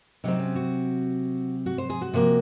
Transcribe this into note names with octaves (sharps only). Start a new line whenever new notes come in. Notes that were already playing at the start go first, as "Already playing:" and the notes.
C3 F#3 C4 D#4
C#4
F#4
F#4
C5
G#4
F#4
C3 F3 A#3